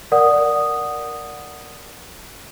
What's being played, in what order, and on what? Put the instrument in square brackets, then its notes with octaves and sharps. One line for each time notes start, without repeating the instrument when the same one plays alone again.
[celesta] A#4 D5 F#5 D#6